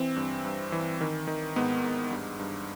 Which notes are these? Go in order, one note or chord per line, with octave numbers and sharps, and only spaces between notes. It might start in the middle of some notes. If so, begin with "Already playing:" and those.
Already playing: E3 C4
G2
G2
E3
D#3
D#3
G#2 B3
G#2
G2
G2